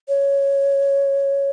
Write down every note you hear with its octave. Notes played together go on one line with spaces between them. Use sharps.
C#5